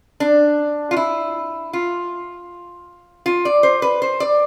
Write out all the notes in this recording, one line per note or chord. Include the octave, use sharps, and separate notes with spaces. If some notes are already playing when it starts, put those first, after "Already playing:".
D4
F4
E4
F4
F4
D5
C5
B4
C5
D5